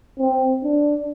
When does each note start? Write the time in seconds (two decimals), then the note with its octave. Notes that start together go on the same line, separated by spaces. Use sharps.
0.19 C4
0.63 D4